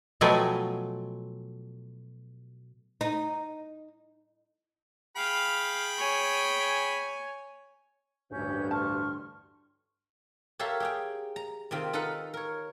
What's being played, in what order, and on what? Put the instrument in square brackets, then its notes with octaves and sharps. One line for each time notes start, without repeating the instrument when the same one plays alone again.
[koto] B2 F3 F#3 A3 G5 G#5
[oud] D#4
[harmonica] G#4 G5 B5 [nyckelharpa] F5
[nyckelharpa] C#5 G#5
[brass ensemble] A1 D2 G2 [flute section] C#4 G6
[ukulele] A5 [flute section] C6 C#6 F6
[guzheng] G4 A4 A#4 C#5 E5 F5
G4 G#4 G5
A#5
C3 D#3 C4 F4
D#4 A4 B4 F5 F#5 A#5
A#4 C#5